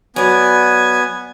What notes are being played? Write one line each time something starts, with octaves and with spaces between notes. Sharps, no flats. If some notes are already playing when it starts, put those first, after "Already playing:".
F#3 B3 D5 G#5